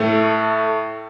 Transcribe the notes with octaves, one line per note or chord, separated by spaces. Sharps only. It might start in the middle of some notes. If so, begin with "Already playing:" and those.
Already playing: A2 A3